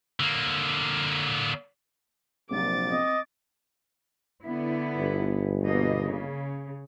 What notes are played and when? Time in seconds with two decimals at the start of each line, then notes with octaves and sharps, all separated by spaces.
0.20 D3 A#3
2.51 A#1 C3 F#3 D6 A6
2.92 C4 D#5
4.44 D3 B3 E4
4.97 G1
5.64 B2 A#3 D#5
6.04 C#3